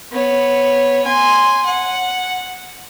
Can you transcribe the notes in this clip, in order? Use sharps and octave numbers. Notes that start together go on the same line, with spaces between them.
B3 C#5
G#5 C6
F#5